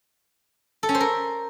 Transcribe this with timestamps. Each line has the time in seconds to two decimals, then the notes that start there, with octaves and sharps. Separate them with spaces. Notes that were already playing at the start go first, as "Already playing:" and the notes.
0.83 A4
0.89 C#4
0.95 C5
1.00 A#4